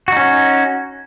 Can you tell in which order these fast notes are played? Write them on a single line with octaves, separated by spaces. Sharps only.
F#4 D#4 C#4